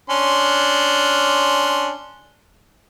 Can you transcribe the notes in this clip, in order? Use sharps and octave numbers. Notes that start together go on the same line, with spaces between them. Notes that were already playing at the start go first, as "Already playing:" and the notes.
C#4 D4 C6